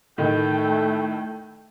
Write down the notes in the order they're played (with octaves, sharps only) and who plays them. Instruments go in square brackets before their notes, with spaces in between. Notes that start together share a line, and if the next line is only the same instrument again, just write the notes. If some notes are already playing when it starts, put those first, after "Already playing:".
[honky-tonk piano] A2 D#3 [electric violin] A3 G5